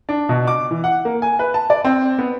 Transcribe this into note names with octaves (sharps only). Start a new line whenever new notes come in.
D4
B2
D6
E3
F#5
A#3
G#5
B4
A5
D5
C4
B3